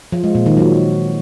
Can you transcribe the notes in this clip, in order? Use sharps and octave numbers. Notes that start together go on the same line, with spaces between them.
F3
G#3
A#2
D#3
F#3